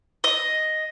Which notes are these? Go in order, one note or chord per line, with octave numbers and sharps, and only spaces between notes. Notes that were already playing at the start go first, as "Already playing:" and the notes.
D#5